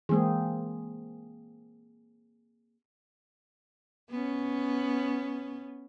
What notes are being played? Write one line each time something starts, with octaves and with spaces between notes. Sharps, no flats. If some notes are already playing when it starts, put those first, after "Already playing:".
E3 G#3 A#3 C4 G#4
B3 C#4